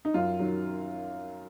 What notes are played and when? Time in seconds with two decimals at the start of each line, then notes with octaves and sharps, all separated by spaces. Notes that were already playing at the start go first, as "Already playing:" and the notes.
0.05 D#4
0.14 F#2 F4
0.39 D#3 F#3